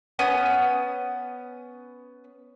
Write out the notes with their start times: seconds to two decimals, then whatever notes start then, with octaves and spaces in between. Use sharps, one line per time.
0.19 B3 C#4 D#6